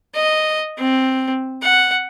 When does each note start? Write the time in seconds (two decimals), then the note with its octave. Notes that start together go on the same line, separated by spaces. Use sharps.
0.15 D#5
0.78 C4
1.62 F#5